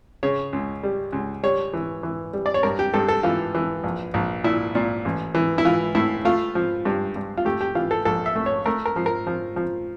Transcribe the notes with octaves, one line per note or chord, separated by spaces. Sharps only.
C#3 C#5
C#2
G3
C#2
G3 C#5
E3
E3
G3
D5
C#5
G2 A#4
G4
G2 A4
A4
E3 F4
E3
A#1
A#1
A#2 E4
A#2
A1
E3
E4
E3 F4
A2 E4
A3 F4
F3
G2
G2
F4
A3 G4
G4
E3 F4
A4
A#1 A4
E5
A3
C#5
A3 A#4
A#4
F3
A#4
F3
F3